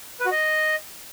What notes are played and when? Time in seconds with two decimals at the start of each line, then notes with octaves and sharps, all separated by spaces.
0.20 B4
0.26 F#4
0.31 D#5